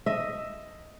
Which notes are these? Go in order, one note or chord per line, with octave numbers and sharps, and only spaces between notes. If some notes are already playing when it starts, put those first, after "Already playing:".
D#5 E5